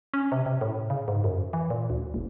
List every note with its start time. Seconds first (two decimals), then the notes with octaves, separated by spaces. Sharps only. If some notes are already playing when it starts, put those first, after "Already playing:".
0.14 C#4
0.32 C3
0.46 C3
0.61 A2
0.90 C#3
1.08 G#2
1.24 F#2
1.53 E3
1.70 A#2
1.90 D2
2.14 F#1